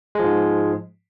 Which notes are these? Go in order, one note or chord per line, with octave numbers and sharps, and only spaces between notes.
G#2 F3 G#3